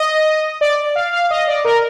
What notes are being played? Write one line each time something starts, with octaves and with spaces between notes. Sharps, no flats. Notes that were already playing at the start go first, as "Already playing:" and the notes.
Already playing: D#5
D5
F5
F5
D#5
D5
A#4